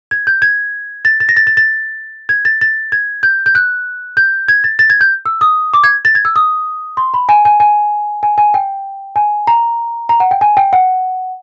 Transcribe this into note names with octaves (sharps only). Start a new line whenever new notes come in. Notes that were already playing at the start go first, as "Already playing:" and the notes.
G#6
G6
G#6
A6
A6
A#6
A6
A6
A6
G#6
A6
A6
G#6
G6
G6
F#6
G6
G#6
A6
A6
G#6
G6
E6
D#6
D6
G#6
A6
G#6
E6
D#6
C6
B5
G#5
G#5
G#5
G#5
G#5
G5
G#5
A#5
A#5
F#5
G5
G#5
G5
F#5